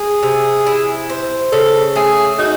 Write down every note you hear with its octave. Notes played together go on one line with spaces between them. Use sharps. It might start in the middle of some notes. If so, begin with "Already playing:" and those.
Already playing: G#4
C3
E4
C5
C#3 A4
A3 G#4
D#4 F#4